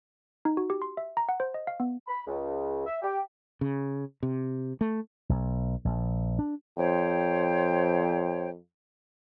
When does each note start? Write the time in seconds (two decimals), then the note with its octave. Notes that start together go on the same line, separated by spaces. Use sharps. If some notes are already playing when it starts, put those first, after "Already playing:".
0.45 D#4
0.57 F#4
0.70 G4
0.82 C6
0.97 E5
1.17 A#5
1.29 F#5
1.40 C5
1.54 D#5
1.67 F5
1.80 B3
2.07 B5
2.26 C#2
2.86 E5
3.02 G4
3.61 C#3
4.23 C3
4.81 A3
5.29 B1
5.85 A#1
6.39 D4
6.77 F2 C5 C#5 G5